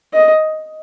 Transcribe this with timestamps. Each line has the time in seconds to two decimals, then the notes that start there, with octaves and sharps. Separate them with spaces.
0.14 D#5